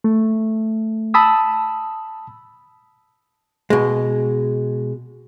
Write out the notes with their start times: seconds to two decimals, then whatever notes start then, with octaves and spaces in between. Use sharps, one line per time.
0.04 A3
1.14 A5 B5 D#6 E6
3.70 B2 G#3